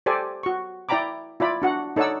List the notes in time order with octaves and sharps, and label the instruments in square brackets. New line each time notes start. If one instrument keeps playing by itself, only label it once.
[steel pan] G4 A4 C5 D5 G#5
F#4 C#6
E4 D5 G5 A#5 B5 D6
E4 F4 D5 B5
D4 F#4 F#5
D#4 A4 C#5 D5 F#5 E6